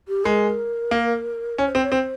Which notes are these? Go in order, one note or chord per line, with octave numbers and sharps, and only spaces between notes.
G4
G#3 A#4
A#3
C#4 C#5
C5
C4
C#5
C4 C5